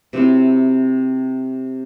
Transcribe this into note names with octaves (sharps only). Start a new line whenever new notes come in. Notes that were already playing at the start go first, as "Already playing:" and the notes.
C3 F#3 C4 E4